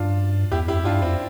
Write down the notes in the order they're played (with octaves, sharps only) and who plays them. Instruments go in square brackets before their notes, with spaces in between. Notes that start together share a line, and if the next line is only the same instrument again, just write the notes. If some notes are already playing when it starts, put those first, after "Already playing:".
Already playing: [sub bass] G2 [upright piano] D4 F4
[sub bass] E2 [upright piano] E4 G4
[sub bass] F2 [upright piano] E4 G4
[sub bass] G2 [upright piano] D4 F4
[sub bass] F2 [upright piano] C4 E4